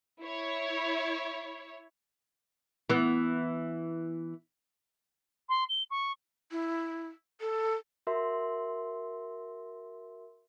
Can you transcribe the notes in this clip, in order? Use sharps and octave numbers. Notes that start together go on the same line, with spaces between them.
E4 C#5
E3 B3
C6
G7
C#6
E4
A4
F#4 A#4 E5 C6